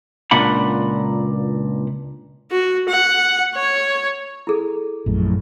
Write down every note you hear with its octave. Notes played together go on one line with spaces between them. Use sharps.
C#2 A#2 D4 F#5 B5
F#4
F#5
C#5
E4 G#4 A4
A#1 F#2 A2